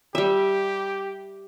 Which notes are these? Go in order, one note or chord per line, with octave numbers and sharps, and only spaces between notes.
G3 G4 E5